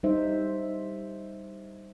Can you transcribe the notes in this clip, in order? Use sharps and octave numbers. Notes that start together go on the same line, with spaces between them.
G3 D#4 C5 E5